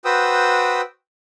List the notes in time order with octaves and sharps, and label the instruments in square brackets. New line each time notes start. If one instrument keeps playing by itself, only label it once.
[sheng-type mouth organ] F#4 B4 C5 G5 D#6 E6